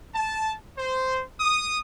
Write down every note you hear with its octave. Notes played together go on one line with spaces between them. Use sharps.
A5
C5
D#6